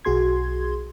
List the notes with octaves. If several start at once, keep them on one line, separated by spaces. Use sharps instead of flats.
B1 F#4 G#4 C6 G#6